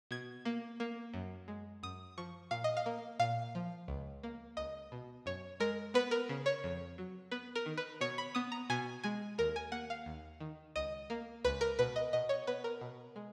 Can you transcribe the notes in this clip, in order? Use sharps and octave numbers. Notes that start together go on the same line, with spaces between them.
B2 G#6
A#3
A#3
F#2
G#3
F#2 D#6
F3 C#6
A#2 F5
D#5
F5
A#3
A#2 F5
F3
C#2
A#3
C#2 D#5
B2
F#2 C#5
G#3 A#4
B3 B4
A#4
C#3
C#5
F2
F#3
B3 B4
A#4
D#3
B4
B2 C#5
B5
B3 D#6
A#5
B2 G#5
G#3 G#5
D#2 A#4
G#5
A#3 F#5
F5
D#2
D#3
C#2 D#5
A#3
C#2 B4
A#4
B2 B4
D#5
B2 D#5
C#5
B3 B4
A#4
B2
G#3